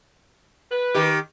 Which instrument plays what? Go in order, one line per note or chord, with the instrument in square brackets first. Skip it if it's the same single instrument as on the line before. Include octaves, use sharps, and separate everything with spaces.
[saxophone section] B4
[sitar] D#3 G4